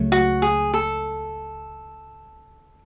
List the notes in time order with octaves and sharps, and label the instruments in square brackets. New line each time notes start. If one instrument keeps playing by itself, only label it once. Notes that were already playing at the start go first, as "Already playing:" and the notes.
Already playing: [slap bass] C#2 C#3 F#3 A3
[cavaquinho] F#4
G#4
A4